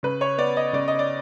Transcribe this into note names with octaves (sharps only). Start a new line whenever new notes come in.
C#3 B4
C#5
B3 D5
D#5
C#3 D5
D#5
D5